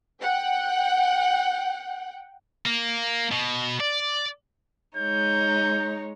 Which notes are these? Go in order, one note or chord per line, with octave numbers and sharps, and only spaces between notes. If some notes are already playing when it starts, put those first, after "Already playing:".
F#5 G5
A#3
B2
D5
G#3 D#4 C#5 G6